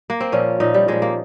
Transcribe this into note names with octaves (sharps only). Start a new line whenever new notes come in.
A#3
C4
A#2 F3 C#4
A#2 F3 D#4
G3
A#2 F3 G#3
A#3